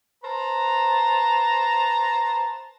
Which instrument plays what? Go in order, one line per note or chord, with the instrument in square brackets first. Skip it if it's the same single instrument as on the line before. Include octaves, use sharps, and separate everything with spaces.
[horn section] B4 C5 A5 A#5